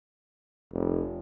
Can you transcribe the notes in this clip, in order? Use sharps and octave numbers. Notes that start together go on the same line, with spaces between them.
F1